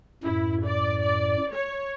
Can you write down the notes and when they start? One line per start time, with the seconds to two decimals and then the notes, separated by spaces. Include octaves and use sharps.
0.23 F#2 A2 E4
0.65 D5
1.01 D5
1.53 C#5